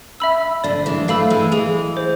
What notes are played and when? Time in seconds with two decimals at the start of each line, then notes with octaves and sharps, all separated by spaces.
0.20 E5 B5 E6
0.64 D3 F3 D5
0.86 E3 G#3
1.08 F3 A3 F5 B5 E6
1.30 E3 G#3
1.52 E3 G#3 G#4
1.97 C5